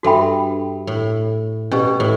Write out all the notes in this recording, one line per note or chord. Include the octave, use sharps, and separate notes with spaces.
G2 F#4 A4 E5 G5 B5
A2
B2 C#4 G4 B4 D5
A2